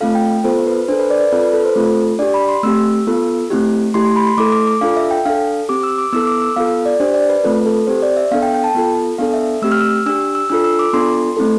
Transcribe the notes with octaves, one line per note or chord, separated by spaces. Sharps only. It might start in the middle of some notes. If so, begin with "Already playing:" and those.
A3 C4 F4 A4 F5
G5
B3 F4 A4 C5
B4
D4 A4 C5
B4
D5
D5
C4 F4 A4 B4
B4
A4
C5
A3 C4 F4 A4
D4 G4 D5
B5
C6
A3 C4 G4 E6
B3 F4 A4
A3 C4 E4 G4
A3 E4 G4 C6
C6
B5
C6
A3 E4 A4 D6
D6
D6
D4 F4 A4 F5
E5
G5
D4 A4 F5
C4 G4 D6
E6
D6
B3 E4 A4 E6
D6
E6
B3 F4 A4 F5
D5
D4 G4 C5
D5
B4
A3 C4 F4 A4 B4
A4
C4 G4 C5
D5
E5
B3 D4 A4 F5
G5
G5
A5
B3 F4 A4
B3 D4 A4 F5
E5
A3 C4 G4 E6
F6
E6
D4 G4 E6
E6
D4 F4 A4 E6
E6
D6
B3 D4 F4 A4 C6
A3 C4 E4 A4